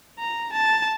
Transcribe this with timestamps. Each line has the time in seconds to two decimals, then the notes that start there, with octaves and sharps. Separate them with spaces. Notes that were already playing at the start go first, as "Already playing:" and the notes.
0.19 A#5
0.53 A5